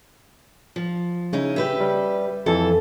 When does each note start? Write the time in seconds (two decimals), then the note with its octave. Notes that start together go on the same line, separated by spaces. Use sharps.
0.76 F3
1.33 C#3 C#4 D#4 E4
1.56 G4 B4 E5
1.80 G3
2.46 F2 E3 A4